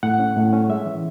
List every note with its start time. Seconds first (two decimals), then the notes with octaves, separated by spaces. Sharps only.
0.03 A2 F#5
0.19 C#4
0.36 A2
0.53 C#4
0.69 G#3 E5
0.86 E3